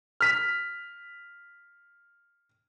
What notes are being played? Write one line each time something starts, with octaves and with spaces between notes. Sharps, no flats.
F6 B6